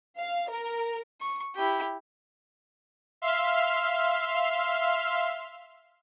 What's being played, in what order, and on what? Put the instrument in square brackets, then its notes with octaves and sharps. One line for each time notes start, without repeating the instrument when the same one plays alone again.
[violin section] F5
A#4
[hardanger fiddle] C#6
E4 G4
[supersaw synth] E5 F5 C6 F6